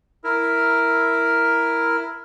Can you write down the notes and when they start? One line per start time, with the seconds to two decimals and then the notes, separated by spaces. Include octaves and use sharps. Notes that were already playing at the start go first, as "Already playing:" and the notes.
0.24 E4 A#4